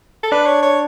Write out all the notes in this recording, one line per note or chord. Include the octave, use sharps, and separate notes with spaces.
A4
D4 B4
C#5
C#5